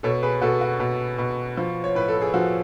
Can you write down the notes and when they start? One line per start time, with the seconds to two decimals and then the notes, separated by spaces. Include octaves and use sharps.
0.03 B2 A4 C#5
0.23 G#4 B4
0.41 B2 F#4 A4
0.61 F#4
0.80 B2
1.18 B2
1.57 F3
1.84 C#5
1.95 A2 B4
2.08 A4
2.22 G#4
2.34 F3 F#4